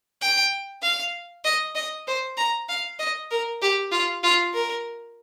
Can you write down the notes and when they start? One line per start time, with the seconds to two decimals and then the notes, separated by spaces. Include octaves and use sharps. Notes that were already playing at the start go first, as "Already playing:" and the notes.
0.22 G5
0.83 F5
1.45 D#5
1.76 D#5
2.07 C5
2.37 A#5
2.69 F5
2.99 D#5
3.31 A#4
3.62 G4
3.92 F4
4.23 F4
4.54 A#4